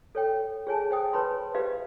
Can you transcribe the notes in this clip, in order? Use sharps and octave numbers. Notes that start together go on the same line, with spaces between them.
A4 C#5 G5
G#4 C#5 G#5 A5
C5 G5 D#6
B4 C#5 A5 B5 C6
G4 B4 C5 D#5 F5